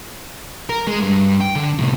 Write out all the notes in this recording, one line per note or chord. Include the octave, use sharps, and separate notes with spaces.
A#4
G#3
G2
G5
D3
A2 C3